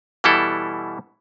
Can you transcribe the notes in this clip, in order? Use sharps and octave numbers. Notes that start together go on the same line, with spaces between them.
B2 E3 G3 E4 A4